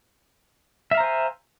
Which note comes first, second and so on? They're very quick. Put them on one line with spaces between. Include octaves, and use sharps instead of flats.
E5 F5 A#5 C5 G#5